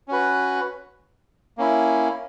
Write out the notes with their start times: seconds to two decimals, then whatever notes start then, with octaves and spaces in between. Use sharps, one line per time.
0.08 C#4 F#4 B4
1.58 A#3 C#4 E4